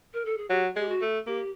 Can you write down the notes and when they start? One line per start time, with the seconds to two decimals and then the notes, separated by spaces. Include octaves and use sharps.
0.13 A#4
0.25 A4
0.37 G#4
0.50 F#3 G4
0.76 G#3 G4
0.89 F#4
1.01 A3
1.27 A#3 G4